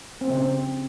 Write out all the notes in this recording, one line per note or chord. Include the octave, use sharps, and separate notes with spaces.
C4
C#3
C4